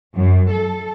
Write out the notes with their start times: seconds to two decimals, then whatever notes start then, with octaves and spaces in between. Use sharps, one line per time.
0.15 F#2
0.51 A4